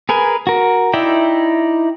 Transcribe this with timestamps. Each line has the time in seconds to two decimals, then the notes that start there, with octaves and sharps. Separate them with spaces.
0.09 G#4 A#4 B4 G#5
0.47 F#4 A#4
0.93 D#4 E4 D5 E5 G5